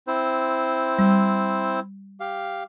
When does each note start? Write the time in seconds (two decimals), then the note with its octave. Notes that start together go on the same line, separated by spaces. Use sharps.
0.08 C4 E4 C5
0.99 G3
2.20 G4 F5